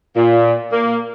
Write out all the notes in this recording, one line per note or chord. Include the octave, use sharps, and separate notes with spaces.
A#2
A#3